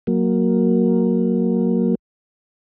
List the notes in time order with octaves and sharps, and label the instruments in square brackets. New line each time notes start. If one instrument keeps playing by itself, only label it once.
[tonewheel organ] F#3 A#3